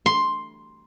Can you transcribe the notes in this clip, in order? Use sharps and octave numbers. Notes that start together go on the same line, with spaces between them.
C6